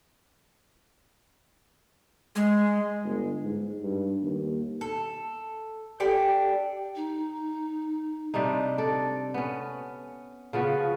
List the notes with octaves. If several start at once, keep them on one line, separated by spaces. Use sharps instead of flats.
G#3
G1
G#2
G2
D#2
A4
D4 G4 A4 G5
D#4
C3 G3 D4 D#4
A4 D5
B3 C#4
C#3 F3 B3 F#4